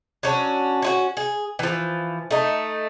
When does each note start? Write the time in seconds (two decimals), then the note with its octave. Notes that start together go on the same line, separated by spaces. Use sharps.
0.23 F#3 C#4 D4
0.82 C#4 F4 F#4
1.17 G#4
1.59 E3 F3
2.31 A3 D#4